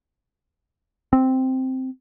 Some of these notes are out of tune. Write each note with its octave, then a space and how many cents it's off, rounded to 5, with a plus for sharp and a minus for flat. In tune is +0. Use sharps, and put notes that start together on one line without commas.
C4 -5